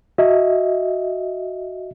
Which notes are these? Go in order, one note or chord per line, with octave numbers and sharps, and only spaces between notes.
F#4 D#5 E5